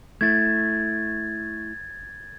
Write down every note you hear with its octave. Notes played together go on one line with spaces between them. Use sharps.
A3 E4 G#6 A6